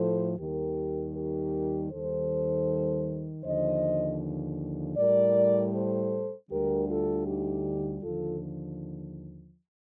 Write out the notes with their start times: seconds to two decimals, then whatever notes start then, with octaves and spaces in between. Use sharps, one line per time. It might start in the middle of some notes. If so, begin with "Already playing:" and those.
Already playing: A2 F3 A4 C5
0.39 D#2 D#3 G3 G4 A#4
1.15 G4 A#4
1.92 D#2 D#3 G3 A4 C5
3.44 D#2 D3 F3 C5 D#5
4.97 A2 G3 A#4 D5
5.73 A4 C5
6.50 D2 D3 G3 G4 A#4
6.88 F4 A4
7.27 D#4 G4
8.03 D#2 D3 F3 F4 A4